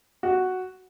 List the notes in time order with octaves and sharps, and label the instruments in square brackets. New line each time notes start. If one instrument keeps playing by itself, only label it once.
[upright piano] F#4